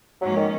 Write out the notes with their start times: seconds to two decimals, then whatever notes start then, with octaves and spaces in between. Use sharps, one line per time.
0.21 G#2 F3 F#3 A#3 C#4
0.37 D#3